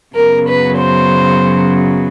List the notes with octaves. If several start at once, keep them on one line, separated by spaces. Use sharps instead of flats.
F#2 C#3 F#3 B3 A#4
B4
C5